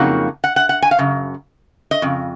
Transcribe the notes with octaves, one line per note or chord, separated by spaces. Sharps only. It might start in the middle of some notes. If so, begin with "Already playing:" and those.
Already playing: F2 C#3 F#3 A#3 D#4 F#5
F#5
F#5
F#5
G#5
F5
F#2 C#3
D#5
F2 C#3